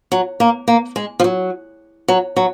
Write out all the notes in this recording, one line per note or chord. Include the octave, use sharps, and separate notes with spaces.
F#3
A#3
A#3
G#3
F3
F#3
F#3
F#3